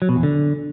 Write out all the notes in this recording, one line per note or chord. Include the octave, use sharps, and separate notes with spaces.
F#3
B2
E2
D3